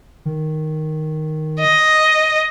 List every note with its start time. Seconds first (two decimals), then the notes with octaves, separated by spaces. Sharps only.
0.25 D#3
1.60 D#5